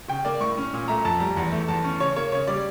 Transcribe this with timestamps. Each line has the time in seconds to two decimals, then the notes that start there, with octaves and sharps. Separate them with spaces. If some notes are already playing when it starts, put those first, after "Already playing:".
0.08 C#3 G5
0.25 A#3 D5
0.40 A2 C#6
0.57 C#4
0.73 A#2
0.88 A3 A#5
1.05 F2 A5
1.20 G3 A#5
1.37 E2
1.52 A3
1.68 E2 A5
1.84 C#4
2.00 C#3 C#5
2.16 A#3 C#5
2.32 C#3 C#5
2.48 G3 D5